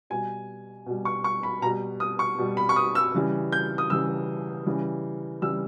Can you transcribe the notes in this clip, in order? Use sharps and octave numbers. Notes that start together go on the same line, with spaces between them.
B2 G3 G#5
B2 G3
C#6
C#6
B5
B2 G3 A#5
D#6
C#6
B2 G3
B5
C#6
D#6
E6
C#3 E3 G3
G6
D#6
C#3 E3 G3 E6
C#3 E3 G3
C#3 E3 G3 E6